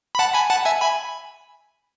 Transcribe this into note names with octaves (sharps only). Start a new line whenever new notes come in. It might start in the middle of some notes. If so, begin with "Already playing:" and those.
B5
F#5 A5
G#5 B5
F#5 A5
E5 G#5
G#5 B5